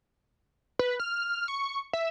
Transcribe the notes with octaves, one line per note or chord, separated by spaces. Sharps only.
B4
F6
C#6
E5